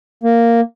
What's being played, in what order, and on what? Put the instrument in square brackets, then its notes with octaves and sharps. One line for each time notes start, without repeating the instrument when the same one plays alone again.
[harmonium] A#3